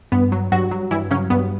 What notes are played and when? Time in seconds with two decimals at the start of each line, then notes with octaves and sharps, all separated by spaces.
0.12 G2 B3
0.32 F#3
0.52 G2 F#3 F#4
0.71 F#3
0.91 G2 E3 E4
1.11 C#3 F#3 C#4
1.30 G2 B3